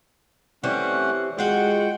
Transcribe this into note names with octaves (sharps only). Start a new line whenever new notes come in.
E3 G3 A3 C4 C#4 F#5
G#3 F4 F#4 F#5 G5